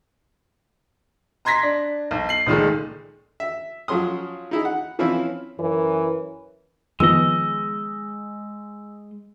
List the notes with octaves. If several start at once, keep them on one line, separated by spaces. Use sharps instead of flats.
A#5 C6 G#6 A#6 B6
D4
B1
C7 F#7
C#2 A#2 D#3 G#3 A3
E5
F3 F#3 C#4 C6 D#6
D#4 E4 G#4
F#5
E3 F3 C4 C#4 E4 F4
F#2 E3 A#4 C#5
D#3 F3 G#3 B3 D#5 E6